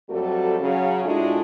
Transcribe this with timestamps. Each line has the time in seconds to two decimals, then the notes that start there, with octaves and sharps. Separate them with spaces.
0.10 F2 F#3 G3 A3 F#4 A4
0.60 C#3 F#3 C#4
1.04 A2 G#3 A3 D4 F4 F#4